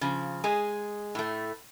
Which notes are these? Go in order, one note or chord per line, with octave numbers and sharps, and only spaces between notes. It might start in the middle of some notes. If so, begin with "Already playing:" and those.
C#3 F3
G#3 G#4
A2 A3